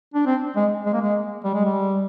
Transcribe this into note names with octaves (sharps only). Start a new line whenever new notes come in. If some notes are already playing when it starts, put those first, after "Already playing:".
D4
C4
G#3
G#3
A#3
G#3
G3
G#3
G3